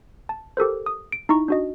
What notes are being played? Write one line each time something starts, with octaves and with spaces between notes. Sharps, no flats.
A5
G4 A4 A#4 C5
D#6
D7
D#4 E4 A#5 C#6
D4 F#4 D#5